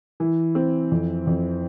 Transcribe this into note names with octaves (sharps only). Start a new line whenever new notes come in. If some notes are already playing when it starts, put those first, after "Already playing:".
E3
C4
F2
F2